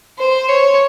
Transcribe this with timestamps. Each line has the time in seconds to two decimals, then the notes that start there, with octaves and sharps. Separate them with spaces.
0.19 C5
0.49 C#5